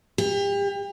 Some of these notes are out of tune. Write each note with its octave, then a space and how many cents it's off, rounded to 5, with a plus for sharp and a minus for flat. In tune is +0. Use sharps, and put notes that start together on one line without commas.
G4 +35